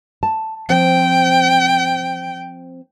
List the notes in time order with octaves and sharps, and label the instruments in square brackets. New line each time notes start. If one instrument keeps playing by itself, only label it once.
[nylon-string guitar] A5
[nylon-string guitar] F3 C4 C5 [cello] G5